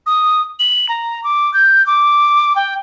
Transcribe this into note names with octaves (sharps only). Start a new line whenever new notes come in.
D#6
F#7
A#5
D6
G6
D6
G5